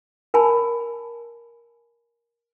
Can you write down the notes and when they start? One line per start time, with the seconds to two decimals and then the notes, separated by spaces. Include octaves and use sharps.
0.34 A#4 G#5 A5 B5